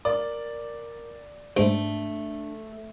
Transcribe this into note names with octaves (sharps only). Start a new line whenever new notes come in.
A#4 D5
G#2 A3 D4 A4 C5